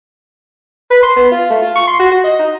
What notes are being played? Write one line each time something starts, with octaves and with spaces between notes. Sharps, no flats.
B4
C6
B3
F4
A3
F4
C#6
C6
F#4
F#4
D#5
D#4